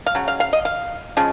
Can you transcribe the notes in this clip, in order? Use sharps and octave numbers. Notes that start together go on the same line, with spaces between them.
F5
C#3 F#3
F5
F5
D#5
F5
C#3 F3 G#3